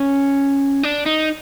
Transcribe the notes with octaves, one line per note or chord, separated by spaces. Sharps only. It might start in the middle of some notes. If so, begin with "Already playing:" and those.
Already playing: C#4
D4
D#4